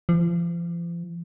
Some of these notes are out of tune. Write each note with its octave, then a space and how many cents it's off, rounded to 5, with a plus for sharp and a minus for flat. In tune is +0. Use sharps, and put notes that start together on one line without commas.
F3 -40